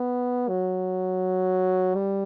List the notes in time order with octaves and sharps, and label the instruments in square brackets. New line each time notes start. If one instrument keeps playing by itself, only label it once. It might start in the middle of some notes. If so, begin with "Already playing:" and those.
Already playing: [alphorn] B3
F#3
G3